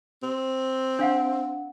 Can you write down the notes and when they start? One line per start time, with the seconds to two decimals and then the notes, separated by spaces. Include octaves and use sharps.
0.23 C4
0.99 D4 F5 F#5